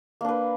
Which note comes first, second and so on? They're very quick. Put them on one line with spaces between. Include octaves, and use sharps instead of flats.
A#3 D4 B4